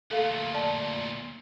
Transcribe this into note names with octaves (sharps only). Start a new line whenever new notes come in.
D2 A#2 A4 F5
D5 A5